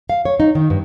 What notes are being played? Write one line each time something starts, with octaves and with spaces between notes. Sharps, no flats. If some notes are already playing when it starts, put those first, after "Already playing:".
F5
C#5
D#4
D#3
G2